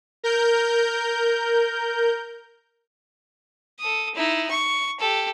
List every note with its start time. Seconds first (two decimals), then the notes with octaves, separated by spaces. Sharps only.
0.24 A#4 G6
3.80 A4 D#6
4.15 D#4 E4
4.50 C#6
5.00 G4 A4